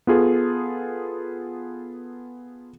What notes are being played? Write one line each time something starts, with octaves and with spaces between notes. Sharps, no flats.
B3 F4 G#4 A4